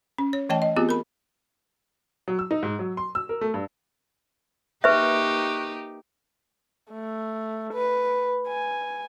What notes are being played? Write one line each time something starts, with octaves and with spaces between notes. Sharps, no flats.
C#4
C#5
E3 A3 C#5 D#5 G5 A5
D#5
B3 C4 F4 G4 G#4
A#4 B5
F#3
E6
D#4
G#2
F#3
C6
E6
A#4
A3
G2
A#3 D#4 G4 B4 E5 C#6 F#6
A3
B4
G#5